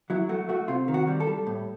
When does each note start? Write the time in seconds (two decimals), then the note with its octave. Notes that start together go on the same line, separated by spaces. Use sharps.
0.10 F#3 E4
0.29 A3 F#4
0.49 A3 F#4
0.68 C3 F4
0.88 D#3
0.94 F#4
1.07 G3
1.20 A4
1.27 G3
1.47 A2